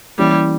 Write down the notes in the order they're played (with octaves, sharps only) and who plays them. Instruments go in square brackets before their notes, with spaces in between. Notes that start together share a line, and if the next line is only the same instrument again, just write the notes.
[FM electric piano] E3 A#3 C#4 E4 G4 [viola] G3